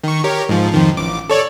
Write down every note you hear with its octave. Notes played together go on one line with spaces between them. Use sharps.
D#3 C#6
G4 A#4 C#5
G#2 F3
F2 D#3 F3
A1 D6
A4 C#5 D5